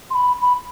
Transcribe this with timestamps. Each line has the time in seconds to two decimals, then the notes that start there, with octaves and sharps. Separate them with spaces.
0.10 C6
0.14 B5
0.41 B5